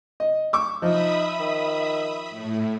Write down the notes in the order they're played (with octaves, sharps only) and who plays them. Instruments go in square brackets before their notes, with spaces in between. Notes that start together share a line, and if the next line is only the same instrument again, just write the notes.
[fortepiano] D#5
C#6 D6 E6
[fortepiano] F3 [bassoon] D#4 [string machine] E5 B5 D#6
[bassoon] D#3
[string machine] A2